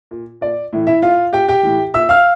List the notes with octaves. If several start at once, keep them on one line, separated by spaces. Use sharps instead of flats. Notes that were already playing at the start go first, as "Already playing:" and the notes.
A#2
A#2 D5
A2 E3
E4 E5
A#2 F4 F5
A#2 G4 G5
G4 G5
A2 E3
A#2 E5 E6
F5 F6